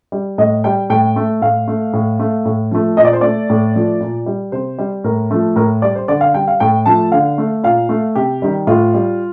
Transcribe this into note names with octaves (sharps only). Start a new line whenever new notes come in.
G3
A2 D#5
G3 G5
A2 G5
A3
A2 F5
A3
A2
A3
A2
F3 A3
A#2 D#5
D5
C5
A3 D5
A2
F3 A3
A#2
G3
C3 C5
G3
A2 A#4
F3 A3
A2 A#4
G3 D5
C5
D3 D5
F5
G3 G5
F5
A2 G5
F3 A3 A5
D3 F5
A3
A#2 F5
A3
C3 G4
D#3 G3
A2 F4
G3